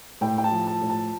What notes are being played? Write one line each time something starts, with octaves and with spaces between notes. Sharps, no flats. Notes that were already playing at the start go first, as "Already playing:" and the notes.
A2 G5
G5
A5
F3
A5
A2
A5